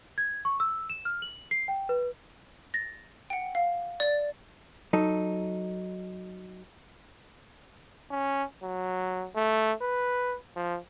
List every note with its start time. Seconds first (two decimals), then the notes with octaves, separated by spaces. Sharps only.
0.18 G#6
0.45 C#6
0.60 E6
0.90 E7
1.05 F6
1.22 F#7
1.51 C7
1.68 G5
1.89 B4
2.74 A6 A#6
3.30 F#5 G5
3.55 F5
4.00 D5 A6
4.93 F#3 D#4 A4
8.11 C#4
8.63 F#3
9.35 A3
9.81 B4
10.56 F3